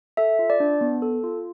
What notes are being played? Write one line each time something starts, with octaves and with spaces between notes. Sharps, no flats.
A4 E5
F4
D5
D4
B3
A4
F4